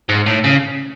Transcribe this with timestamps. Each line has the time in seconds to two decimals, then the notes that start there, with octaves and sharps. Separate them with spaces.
0.09 G#2
0.26 A2
0.44 C#3